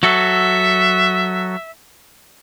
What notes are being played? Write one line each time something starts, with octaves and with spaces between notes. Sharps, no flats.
F#3 F#4 A4 E5